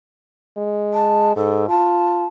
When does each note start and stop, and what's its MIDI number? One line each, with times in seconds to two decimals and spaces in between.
0.57 1.32 56
0.93 1.35 81
1.36 1.68 44
1.36 1.66 69
1.68 2.25 65
1.68 2.26 81